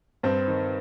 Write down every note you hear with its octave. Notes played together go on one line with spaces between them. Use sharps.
G2 C4
D#3